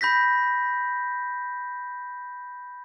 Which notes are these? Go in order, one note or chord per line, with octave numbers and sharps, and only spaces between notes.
B5 G6 A#6 B6